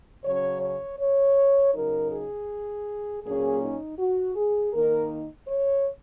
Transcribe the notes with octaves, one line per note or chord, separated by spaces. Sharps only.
C#3 F#3 C#4 C#5
C#5
C#5
C#3 F#3 D#4 A#4
G#4
A#2 F#3 A#3 C#4 G#4
D#4
F#4
G#4
D#3 A#3 D#4 A#4
C#5